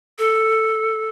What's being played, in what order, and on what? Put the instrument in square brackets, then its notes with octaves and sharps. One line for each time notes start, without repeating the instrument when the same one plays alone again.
[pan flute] A4